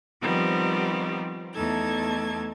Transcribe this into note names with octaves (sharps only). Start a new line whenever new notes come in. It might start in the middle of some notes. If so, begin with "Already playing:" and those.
D#3 F3 G3 B3 C4
E2 A3 D#4 A4 A5 G#6